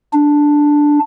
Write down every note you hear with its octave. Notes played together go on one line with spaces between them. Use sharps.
D4